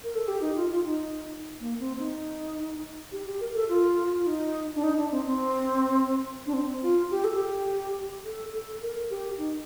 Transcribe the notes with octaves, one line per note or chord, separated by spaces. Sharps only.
A#4
A4
G4
D#4
F4
F4
D#4
A#3
C4
D#4
G4
G4
A#4
A4
F4
F4
D#4
D4
D#4
D4
C4
C4
D4
C4
F4
G4
A4
G4
A4
A4
A#4
G4
D#4